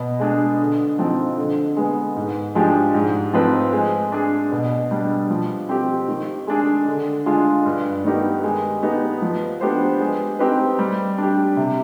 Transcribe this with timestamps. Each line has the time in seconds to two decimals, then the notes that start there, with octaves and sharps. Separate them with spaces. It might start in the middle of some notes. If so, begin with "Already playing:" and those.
Already playing: B2
0.20 G#3 D4 G#4
0.60 D3
0.99 F3 C4 D#4
1.38 D3
1.77 G#3 B3
2.16 G#2
2.55 F3 G#3 D4 G4
2.94 G#2
3.34 F3 C4 D#4 B4
3.73 G#3
4.12 D4 G#4
4.52 B2
4.91 G3 D4
5.30 F3
5.69 C4 G4
6.08 D#3
6.47 G#3 D4 G#4
6.87 D3
7.26 G#3 D4 F4
7.66 G2
8.04 D#3 B3 D#4 G4
8.44 G#3
8.83 B3 D#4 G4
9.22 F3
9.61 B3 D4 G4 C5
10.00 G#3
10.39 C4 D#4 G4 B4
10.79 G3
11.18 D4 G4
11.57 C3